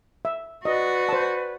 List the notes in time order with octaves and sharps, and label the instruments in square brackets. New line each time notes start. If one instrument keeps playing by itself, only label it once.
[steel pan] E5
[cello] F#4 [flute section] B4 D5 [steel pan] D#5
[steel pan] C5 A5